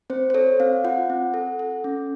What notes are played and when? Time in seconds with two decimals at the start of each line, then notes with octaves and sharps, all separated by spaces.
0.10 C4 C5
0.30 C5
0.34 A4 C#5
0.60 C4 F5
0.84 F4 F#5
1.10 C4
1.34 A4
1.59 A4
1.84 C#4